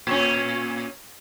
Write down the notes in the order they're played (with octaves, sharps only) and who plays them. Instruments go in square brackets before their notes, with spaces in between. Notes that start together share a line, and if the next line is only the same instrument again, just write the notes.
[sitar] A#2 C#4